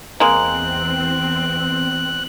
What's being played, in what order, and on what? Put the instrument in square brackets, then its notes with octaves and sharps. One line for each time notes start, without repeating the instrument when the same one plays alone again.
[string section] E2 C4 [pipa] G#3 A#3 [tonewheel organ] F#6